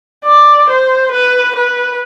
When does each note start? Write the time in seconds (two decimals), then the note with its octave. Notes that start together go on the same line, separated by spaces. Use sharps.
0.25 D5
0.69 C5
1.12 B4
1.56 B4